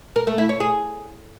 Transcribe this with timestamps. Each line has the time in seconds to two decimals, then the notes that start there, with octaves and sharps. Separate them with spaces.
0.16 A#4
0.27 A3
0.38 E4
0.49 C#5
0.60 G#4